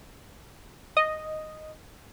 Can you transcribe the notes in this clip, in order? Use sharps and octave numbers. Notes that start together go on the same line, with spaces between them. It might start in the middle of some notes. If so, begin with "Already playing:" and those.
D#5